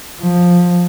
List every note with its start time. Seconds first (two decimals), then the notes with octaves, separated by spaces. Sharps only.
0.22 F3